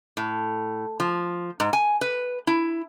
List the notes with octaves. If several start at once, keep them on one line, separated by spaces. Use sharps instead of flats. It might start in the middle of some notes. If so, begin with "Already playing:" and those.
A2
F3
G#2
G#5
B4
E4